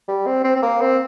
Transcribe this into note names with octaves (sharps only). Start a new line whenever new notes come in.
G3
C4
C4
C4
A#3
C4